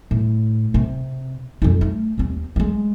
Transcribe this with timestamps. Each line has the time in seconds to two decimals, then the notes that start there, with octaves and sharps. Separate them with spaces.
0.11 A2
0.74 C3
1.62 F2 D#4
1.81 A3
2.18 D#2 C4
2.56 G3 G#3